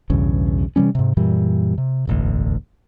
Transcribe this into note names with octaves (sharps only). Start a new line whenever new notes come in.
B1 E2 G2 C#3
C3 E3 G3 C#4
G#2 C3
F#2 A#2 E3 G3
C3
E1 A1 D2